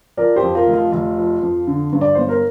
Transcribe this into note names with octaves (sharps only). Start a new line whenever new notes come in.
F3 A#4 D5
G4 C5
F2
F4 A#4
F1
F4
F1 F4
F3
F2
D3
G2
D5
G1 C5
A#4